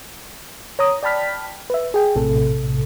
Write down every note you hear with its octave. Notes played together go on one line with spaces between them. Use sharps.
C#5 A#5 D#6
D5 G5 A5 B5 F6 B6
B4 E5
G#4 G5
A#1 A2 C3 A4